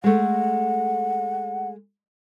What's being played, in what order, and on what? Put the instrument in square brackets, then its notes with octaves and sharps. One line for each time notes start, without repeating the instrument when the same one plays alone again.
[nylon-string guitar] G#3 A3 [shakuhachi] F#5